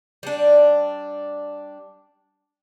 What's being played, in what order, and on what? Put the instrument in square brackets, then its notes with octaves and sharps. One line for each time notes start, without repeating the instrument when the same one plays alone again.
[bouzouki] G3 D4